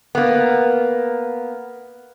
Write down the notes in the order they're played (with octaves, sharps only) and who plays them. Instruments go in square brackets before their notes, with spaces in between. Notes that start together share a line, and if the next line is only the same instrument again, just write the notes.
[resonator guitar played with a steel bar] A#3 B3